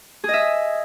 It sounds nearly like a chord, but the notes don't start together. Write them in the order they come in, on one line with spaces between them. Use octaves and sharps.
G#4 D#5 E5